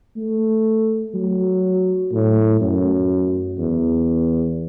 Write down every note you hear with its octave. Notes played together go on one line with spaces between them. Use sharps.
A3
F#3
A2
F#2
E2